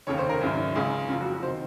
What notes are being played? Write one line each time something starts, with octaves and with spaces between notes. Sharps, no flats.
F1 D#2 C#3 C#5
C5
A#4
G#1 F#2 C#3
C#2 C#3 G#4
F#1 F2 C#3 F4
F#4
F#4
C3 D#3 C5